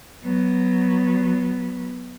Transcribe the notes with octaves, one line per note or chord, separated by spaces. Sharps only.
F#3 B3